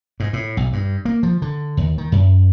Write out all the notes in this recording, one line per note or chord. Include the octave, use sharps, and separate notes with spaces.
G#2
A2
B1
G2
A#3
F3
D3
D#2
D#3
F#2